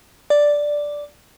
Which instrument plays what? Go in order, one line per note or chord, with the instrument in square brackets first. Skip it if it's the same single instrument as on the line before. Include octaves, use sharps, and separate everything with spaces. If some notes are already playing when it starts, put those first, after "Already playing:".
[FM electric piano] D5